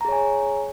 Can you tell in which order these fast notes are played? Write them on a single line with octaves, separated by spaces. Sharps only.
A#5 G#4 C#5 G#5